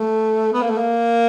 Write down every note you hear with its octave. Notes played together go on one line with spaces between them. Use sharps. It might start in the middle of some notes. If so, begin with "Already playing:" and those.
Already playing: A3
B3
A#3
A3
A#3